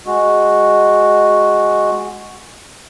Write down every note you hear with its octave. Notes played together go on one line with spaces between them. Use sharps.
G#3 F#4